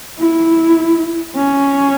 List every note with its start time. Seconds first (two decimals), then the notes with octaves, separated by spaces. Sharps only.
0.19 E4
1.36 C#4